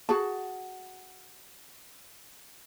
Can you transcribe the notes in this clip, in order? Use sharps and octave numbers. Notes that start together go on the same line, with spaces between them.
F#4 G#4 A5